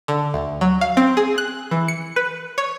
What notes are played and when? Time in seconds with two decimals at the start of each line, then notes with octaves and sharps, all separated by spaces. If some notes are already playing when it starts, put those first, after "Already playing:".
0.08 D3
0.34 D2
0.61 F#3
0.81 F5
0.97 C4
1.17 G#4
1.38 F#6
1.71 E3
1.88 C#7
2.16 B4
2.58 C#5